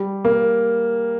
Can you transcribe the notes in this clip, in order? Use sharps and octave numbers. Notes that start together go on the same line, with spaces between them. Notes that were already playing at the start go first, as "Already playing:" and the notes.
Already playing: G3
A#3